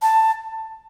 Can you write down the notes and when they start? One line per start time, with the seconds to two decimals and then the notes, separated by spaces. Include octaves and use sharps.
0.02 A5